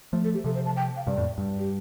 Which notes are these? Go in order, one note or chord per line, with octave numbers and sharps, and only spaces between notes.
F3 A3
A4
G4
C3 F3 A4
C5
A5
G5
F5
G2 C3 D5
F2 A2
G2
G4